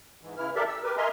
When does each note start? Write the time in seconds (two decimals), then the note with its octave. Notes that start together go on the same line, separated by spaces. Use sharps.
0.21 G#2 E3
0.37 C#3 E3 E4 F6
0.56 G4 A4 A#4 D5 E5
0.68 E6
0.84 G4 A#4 B4
0.97 A#4 D#5 E5 G#5 A#5 C6